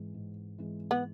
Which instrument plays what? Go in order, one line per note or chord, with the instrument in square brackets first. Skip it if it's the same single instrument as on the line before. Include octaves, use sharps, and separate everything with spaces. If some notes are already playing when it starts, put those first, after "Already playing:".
Already playing: [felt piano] G#2 E3 G#3
G#2
E3 G#3
[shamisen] B3